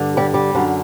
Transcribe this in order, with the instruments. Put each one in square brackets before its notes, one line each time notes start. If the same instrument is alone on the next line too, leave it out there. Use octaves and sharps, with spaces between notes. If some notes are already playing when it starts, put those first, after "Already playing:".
Already playing: [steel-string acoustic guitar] G2 D3
G3
G3
F#2 D3